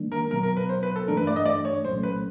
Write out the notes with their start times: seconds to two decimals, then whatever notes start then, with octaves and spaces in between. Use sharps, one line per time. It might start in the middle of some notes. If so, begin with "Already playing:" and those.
Already playing: D#3 G3 A#3 D4
0.12 A#4
0.31 B2 F#3 B3 A#4
0.43 A#4
0.57 B4
0.69 C5
0.83 B4
0.96 A4
1.08 G2 E3 A3 D4 A#4
1.17 B4
1.27 D5
1.36 D#5
1.46 D5
1.65 C#5
1.84 C2 A#2 F#3 A3 C#4 C5
2.03 B4